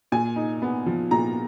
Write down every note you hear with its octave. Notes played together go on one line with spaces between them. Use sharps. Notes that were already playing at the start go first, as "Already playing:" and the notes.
A#2 G#5
D#4
B3
F3
A#2 A#5